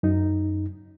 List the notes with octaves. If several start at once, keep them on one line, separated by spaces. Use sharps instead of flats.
F#2 D#4